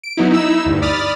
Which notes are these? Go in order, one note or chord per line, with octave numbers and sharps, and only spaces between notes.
D7
F#3 B3 D#4 E4
D#4 E4 E6
D2 G2
D5 B5 D#6 F6 A6